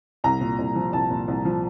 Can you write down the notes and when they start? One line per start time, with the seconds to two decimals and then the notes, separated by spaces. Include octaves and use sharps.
0.24 C2 A#5
0.41 A#2
0.59 C2
0.75 F3
0.93 C2 A5
1.11 A#2
1.28 C2
1.45 F3